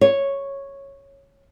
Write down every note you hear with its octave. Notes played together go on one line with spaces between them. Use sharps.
C#5